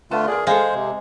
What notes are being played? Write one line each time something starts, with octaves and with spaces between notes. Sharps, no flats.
D3 A3 F4 B4 A5
G#4 A#4 D5
G#3 A4 C5 E5 F5
C3